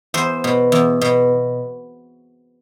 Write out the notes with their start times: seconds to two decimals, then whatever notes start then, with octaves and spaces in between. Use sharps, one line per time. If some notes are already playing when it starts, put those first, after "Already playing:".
0.14 E2 C5
0.44 B2
0.72 E2
1.01 B2